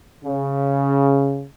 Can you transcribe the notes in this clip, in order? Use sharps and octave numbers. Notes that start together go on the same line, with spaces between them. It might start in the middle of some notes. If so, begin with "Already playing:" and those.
C#3